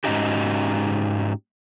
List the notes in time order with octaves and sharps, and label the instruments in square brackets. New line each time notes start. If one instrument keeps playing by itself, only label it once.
[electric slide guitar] G#2 C#3 C#4 D#4 F#4 G4